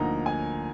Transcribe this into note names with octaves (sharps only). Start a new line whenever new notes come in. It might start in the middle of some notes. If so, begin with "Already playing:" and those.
Already playing: D2 D3 F3 A#3 D#4 A#5
G#5